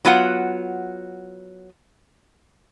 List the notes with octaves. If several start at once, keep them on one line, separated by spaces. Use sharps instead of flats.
F#3 B3 F4 F#5